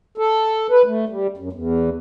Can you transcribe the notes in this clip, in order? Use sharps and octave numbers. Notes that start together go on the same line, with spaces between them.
A4
B4
A3
G3
F#2
E2